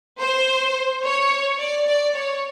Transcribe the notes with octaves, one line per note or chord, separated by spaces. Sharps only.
C5
C#5
D5
D5
C#5